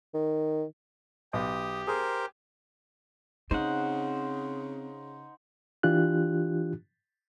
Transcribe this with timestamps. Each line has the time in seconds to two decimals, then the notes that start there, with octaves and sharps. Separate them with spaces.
0.14 D#3
1.33 B1 G4 D#6
1.87 G#4 A#4 C5
3.51 C#3 C4 D#4 C5 F#5
5.83 E3 D4 F4 G4 F#6